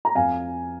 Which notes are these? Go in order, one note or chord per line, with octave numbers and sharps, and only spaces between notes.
A#5
F2 F5 G#5